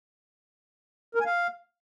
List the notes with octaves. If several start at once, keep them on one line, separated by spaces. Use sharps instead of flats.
A#4
G#5
F5